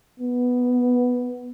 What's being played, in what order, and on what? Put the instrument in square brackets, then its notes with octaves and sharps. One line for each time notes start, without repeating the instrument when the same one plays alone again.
[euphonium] B3